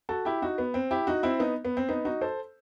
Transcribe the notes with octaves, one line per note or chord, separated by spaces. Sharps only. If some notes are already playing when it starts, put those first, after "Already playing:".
F#4 A4
E4 G4
D#4 F#4
B3
C4
E4 G4
D#4 F#4
C4 E4
B3 D#4
B3
C4
B3 D#4
D#4 F#4
A4 C5